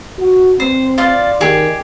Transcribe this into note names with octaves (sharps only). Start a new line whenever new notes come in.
F#4
C4 C5
F4 D5 C6
D#3 G4 G#4